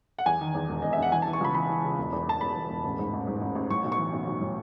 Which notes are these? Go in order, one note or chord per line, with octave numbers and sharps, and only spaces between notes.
F#5
E2 G#5
D#3
E2
E1
E1 D#5
E5
E1 F#5
E3 G#5
E3 A5
C#6
C#2 B5
E3 B5
E3
C#3
E1
E2
E1 A5
E1 B5
E2
E1
A1
G#2
A1
G#2
A1
A1
A2 C#6
B1
C#6
E3
B1
B1
A2